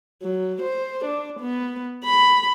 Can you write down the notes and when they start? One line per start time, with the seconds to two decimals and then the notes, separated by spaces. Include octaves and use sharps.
0.23 F#3
0.63 C5
1.05 D4
1.40 B3
2.05 B5